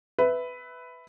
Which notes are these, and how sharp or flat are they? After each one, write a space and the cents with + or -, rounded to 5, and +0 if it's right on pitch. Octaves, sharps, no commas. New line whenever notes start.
B4 +10 E5 -5